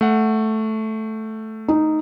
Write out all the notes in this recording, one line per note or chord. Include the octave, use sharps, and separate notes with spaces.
A3 F#5
D#4